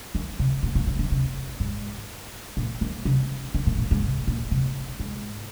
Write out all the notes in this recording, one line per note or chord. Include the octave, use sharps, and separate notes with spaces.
D#3
C3
A#2
A#2
C3
D#3
C3
G#2
A#2
D#3
C3
D#3
A#2
A#2
G#2
C3
A#2
C3
G#2